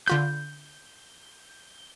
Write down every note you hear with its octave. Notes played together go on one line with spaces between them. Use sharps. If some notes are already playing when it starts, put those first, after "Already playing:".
D3 F4 B5 G6